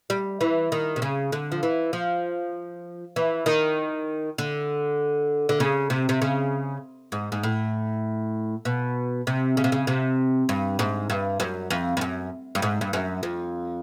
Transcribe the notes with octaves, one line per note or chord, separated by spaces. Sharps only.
G3
E3
D#3
C3
C#3
D3
F3
E3
F3
E3
D#3
D3
D3
C#3
C3
C3
C#3
G#2
G#2
A2
B2
C3
C#3
C3
C#3
C3
G2
G#2
G2
F#2
F2
F2
F#2
G2
G#2
G2
F#2
F2